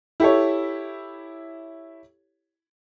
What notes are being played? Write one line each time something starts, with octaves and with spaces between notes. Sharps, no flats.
E4 G4 A4 C#5